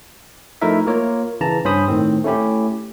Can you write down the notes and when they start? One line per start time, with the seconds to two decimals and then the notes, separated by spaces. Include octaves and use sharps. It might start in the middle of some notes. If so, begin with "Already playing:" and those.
0.62 F3 A3 D#4 E4 A#4 E5
0.87 A#3 F4 A#4 C#5
1.41 C#3 E3 A5 A#5
1.65 G2 C#4 C5 B5 D#6
1.88 A2 D#3 C4
2.24 A3 C#4 E4 G4